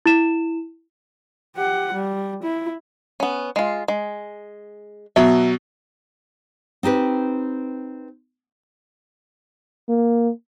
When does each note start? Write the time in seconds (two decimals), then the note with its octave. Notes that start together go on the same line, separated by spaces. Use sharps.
0.06 E4 E7
1.56 G4 F#5
1.93 G3
2.43 E4
3.20 B3 C#4
3.56 G#3 F4
3.88 G#3
5.16 B2 F#3 E5
6.83 C4 D#4 G4 B4
9.89 A#3